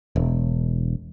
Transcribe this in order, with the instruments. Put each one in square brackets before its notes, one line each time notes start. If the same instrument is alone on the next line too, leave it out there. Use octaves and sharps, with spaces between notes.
[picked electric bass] E1